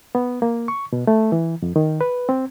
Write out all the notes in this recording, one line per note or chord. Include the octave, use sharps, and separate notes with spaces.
B3
A#3
C#6
B2
A3
E3
F2
D#3
B4
C4